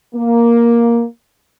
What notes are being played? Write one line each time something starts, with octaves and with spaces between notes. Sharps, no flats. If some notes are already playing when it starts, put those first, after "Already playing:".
A#3